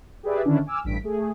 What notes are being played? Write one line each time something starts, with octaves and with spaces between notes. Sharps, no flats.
G4 G#4 B4 D5 E5
D3 D#3 C#4 D4 E4
G#5 D6 E6 F6
A1 G2 B6 D7
A3 G#4